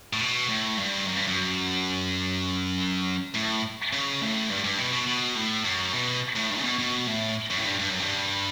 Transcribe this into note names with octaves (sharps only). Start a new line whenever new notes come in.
A2
B2
A2
G2
F#2
G2
F#2
A2
C#3
A2
G2
G2
B2
B2
B2
A2
F#2
B2
A2
G2
C#3
B2
B2
A2
F#2
A2
G2
G2
F#2
G2